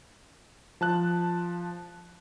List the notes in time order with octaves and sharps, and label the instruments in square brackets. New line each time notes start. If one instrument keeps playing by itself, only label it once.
[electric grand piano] F3 A5 F#6